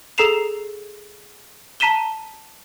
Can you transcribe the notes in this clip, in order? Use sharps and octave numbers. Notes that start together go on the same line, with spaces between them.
G#4 A4 A#5 C7 E7 F7
A5 A#5 B6 D#7 E7 G7